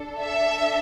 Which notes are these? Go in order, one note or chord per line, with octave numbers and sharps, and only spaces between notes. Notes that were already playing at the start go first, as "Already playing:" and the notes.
Already playing: D4 A4
E5